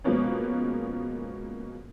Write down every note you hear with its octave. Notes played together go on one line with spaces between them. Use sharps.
B2 F3 G#3 A#3 B3 C#4